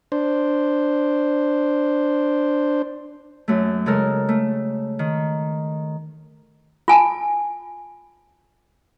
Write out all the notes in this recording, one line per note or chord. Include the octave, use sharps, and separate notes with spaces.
D4 C5
F#2 A3
C#3 G#3 A4 A#4
A3
D#3
F4 G#5 A5